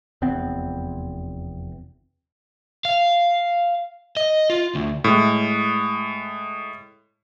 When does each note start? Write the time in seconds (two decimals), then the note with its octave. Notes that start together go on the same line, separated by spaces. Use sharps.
0.22 F1 E2 B3 C4
2.85 F5
4.17 D#5
4.50 F4
4.75 D2
5.04 A2 G#3